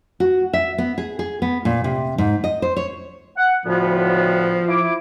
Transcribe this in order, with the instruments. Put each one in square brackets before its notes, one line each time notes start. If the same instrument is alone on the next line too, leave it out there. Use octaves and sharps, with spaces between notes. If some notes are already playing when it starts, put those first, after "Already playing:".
[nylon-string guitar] F#4
E5
B3
G#4
G#4
B3
A#2
C3
G#2
D#5
C5
C#5
[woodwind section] F#5
[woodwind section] D2 A2 B3 [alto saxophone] F3
[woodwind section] E4 D6